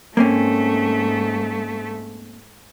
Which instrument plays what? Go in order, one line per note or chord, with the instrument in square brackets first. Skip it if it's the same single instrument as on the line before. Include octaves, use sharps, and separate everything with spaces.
[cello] G#2 A3 [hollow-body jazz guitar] A#3 C4 C#4